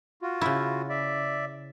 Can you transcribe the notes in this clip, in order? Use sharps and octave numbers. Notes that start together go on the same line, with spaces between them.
F4 F#4
C#3 E4
D5 E5